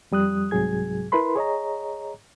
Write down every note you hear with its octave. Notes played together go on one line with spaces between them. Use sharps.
F2 G3 D#6 F#6
C2 G#2 C3 F#3 G#4 G#6
E4 A#4 B4 B5 C6
G#4 C#5 D#5 A#5